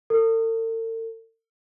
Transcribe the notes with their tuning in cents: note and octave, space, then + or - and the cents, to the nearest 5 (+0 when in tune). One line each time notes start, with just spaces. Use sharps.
A4 +45